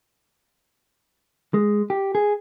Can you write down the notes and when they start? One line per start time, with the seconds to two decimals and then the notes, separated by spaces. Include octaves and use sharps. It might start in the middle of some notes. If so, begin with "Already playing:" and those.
1.54 G#3
1.90 G4
2.15 G#4